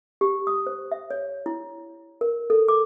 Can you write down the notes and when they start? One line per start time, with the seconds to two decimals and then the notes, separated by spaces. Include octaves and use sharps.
0.21 G4
0.47 D#6
0.67 C5
0.92 E5
1.11 C#5
1.46 E4
2.21 A#4
2.50 A4
2.68 D6